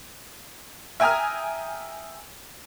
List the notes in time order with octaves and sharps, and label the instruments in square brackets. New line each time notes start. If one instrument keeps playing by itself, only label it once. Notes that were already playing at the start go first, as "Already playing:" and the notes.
[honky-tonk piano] E5 G5 G#5 A#5 D#6 F6